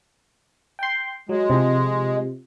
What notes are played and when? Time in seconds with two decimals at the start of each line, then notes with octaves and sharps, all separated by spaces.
0.79 G5 C6
1.29 F#3 G#3
1.50 C3 F3